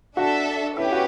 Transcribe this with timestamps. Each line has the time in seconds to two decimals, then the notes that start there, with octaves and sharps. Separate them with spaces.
0.17 D4 F#4 A4 E5
0.77 C#4 E4 G4 B4
0.92 F#4